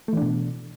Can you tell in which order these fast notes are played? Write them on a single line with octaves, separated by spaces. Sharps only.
A3 E3 D4 B2